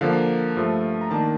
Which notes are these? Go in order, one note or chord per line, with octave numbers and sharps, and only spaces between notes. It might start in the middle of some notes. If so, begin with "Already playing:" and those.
D3 F3 A#3 F5
G2 F3 A3
A#5
D#3 A#3 D4 A5